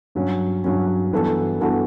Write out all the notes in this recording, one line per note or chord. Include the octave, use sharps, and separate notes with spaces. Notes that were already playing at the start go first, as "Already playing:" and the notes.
G2 F#3 C#4
G2 F#3 C#4
G2 E3 B3 F#4 A4
G2 E3 B3 F#4 A4